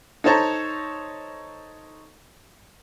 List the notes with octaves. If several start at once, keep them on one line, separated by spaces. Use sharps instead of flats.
D#4 A4 C5 C#5 A5 A#5